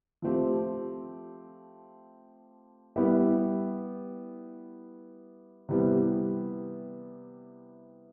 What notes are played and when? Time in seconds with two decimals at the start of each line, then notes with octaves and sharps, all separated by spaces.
0.22 F3 A3 C4 G4
2.96 G3 B3 E4 G4
5.69 C3 E3 G3 B3